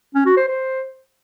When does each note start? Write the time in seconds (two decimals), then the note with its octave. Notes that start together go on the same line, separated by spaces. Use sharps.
0.15 C#4
0.26 F#4
0.37 C5
0.48 C5